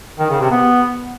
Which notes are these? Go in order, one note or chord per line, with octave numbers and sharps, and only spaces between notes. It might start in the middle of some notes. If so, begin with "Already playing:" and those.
D#3
C#3
C3
B3